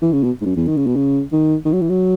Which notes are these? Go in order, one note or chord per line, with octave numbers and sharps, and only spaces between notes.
E3
C#3
B2
G#2
F#2
E2
D#3
C#3
B2
C#3
D#3
D#3
F#3
E3
F#3